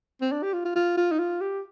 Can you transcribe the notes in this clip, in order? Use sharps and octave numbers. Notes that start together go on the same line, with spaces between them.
C4
D4
G4
F4
F4
F4
F4
D#4
F4
G4